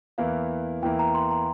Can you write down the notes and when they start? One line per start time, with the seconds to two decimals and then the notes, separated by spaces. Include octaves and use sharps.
0.18 E2 E3 A#3 E4 F5
0.83 E2 E3 A#3 E4 G5
0.99 A#5
1.14 C6
1.31 A#5